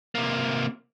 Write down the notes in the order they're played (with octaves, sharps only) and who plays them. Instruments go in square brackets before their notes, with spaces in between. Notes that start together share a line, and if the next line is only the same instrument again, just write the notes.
[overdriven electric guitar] C3 A#3